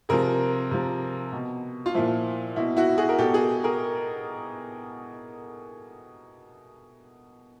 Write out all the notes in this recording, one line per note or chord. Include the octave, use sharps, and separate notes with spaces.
C3 F3 G#4 A#4
C3 F3
B2
F4
A#2 F3 E4
B2 E4
E4 F#4
F#4 G#4
A#4
B2 G4 A4
F#4 G#4
G#4 A#4